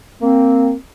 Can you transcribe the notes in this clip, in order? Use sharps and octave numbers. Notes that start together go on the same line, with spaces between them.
A#3 C4